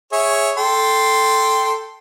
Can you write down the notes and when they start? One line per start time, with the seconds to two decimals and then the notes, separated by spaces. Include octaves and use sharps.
0.12 G#4 C#5 E5
0.57 A4 G5 C6